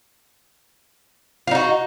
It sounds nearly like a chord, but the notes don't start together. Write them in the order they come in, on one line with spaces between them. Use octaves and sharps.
F4 D#4 F#4